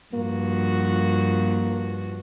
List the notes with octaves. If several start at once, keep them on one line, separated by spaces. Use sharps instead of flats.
G2 F3 A#3 F#4